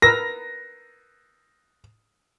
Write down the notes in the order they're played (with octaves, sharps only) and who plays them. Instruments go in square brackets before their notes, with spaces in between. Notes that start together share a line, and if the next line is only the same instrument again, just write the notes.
[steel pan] A#4 B4 E6 [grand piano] A#6